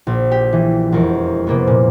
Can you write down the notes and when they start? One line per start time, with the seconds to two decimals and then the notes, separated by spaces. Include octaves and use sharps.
0.07 A#1
0.32 G4
0.53 E3
0.92 E1 F2 A#4 C#6
1.47 C3 A#3 B3
1.67 A#2